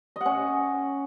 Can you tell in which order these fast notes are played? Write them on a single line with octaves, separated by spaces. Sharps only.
D#5 F#5 C#4